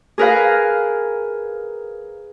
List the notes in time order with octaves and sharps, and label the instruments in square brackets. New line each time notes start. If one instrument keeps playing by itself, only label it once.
[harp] G#4 A#4 B4 F5